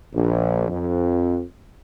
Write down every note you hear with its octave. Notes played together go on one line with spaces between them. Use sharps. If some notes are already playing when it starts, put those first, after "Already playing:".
A#1
F2